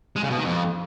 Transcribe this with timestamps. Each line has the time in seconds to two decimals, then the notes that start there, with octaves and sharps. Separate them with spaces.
0.16 G#3
0.23 C#3
0.30 B2
0.37 D#3
0.44 F2